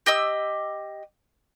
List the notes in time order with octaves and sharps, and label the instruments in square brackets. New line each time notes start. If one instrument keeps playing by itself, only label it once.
[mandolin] G4 D#5 E6